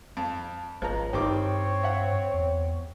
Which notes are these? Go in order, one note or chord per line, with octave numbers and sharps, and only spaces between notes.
F2
G#1 C#2 F3 A#5
G2 D#3 G3 C4 C#5 D6
E5 F#5
E2